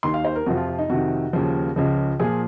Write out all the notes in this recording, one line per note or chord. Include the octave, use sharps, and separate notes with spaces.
D#2 D#3 C6
F5
C5
A#4
F2 C3 F3 F#4
F4
F4
D#4
F2 C3 D#3 F#4
D#2 C#3 F3
C#2 C#3 F3
A#2 F3 G#4